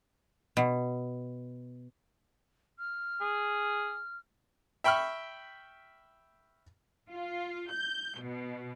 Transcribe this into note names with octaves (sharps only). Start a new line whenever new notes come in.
B2
F6
G#4
E5 G5 B5 C#6 F6
F4
G6
B2